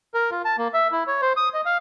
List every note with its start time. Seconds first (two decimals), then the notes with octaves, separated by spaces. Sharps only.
0.14 A#4
0.31 F4
0.45 A5
0.58 A#3
0.74 E5
0.92 E4
1.07 C#5
1.22 C5
1.37 D#6
1.54 D#5
1.65 F5